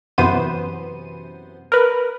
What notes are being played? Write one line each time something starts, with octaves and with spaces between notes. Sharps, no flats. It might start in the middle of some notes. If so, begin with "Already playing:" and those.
F#2 C3 E3 B3 C5 D#7
A#4 B4